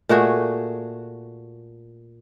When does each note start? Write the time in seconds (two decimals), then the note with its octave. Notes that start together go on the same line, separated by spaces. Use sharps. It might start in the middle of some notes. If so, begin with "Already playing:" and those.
0.09 A#2 A3 F#4 G#4